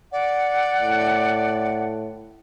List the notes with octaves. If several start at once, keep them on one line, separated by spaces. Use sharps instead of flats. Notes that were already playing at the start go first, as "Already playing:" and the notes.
D5 F#5
A2